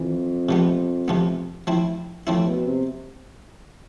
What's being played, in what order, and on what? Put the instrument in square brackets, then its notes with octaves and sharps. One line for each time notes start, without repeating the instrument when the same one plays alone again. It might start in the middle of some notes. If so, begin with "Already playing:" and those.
Already playing: [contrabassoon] F2 [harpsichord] E3
[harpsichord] C3 F3 B3
C3 F3 B3
F3 C4 E4
[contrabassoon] A2 [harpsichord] F3 C4 E4
[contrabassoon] B2
C3